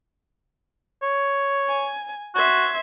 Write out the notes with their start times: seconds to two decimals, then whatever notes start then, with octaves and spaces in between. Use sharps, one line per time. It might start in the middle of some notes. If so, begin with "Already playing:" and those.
1.03 C#5
1.67 G#5
2.35 F#4 E5 C6 G#6